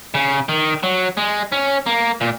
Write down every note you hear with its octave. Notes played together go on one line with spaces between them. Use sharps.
C#3
D#3
F#3
G#3
C#4
A#3
A#2